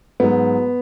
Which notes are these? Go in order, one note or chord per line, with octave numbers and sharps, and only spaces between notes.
G#2 F#3 B3